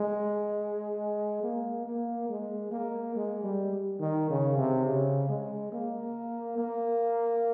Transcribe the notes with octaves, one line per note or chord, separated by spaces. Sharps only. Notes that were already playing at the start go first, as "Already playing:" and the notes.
Already playing: G#3
A#3
A#3
G#3
A#3
G#3
G3
D#3
C#3
C3
C#3
G#3
A#3
A#3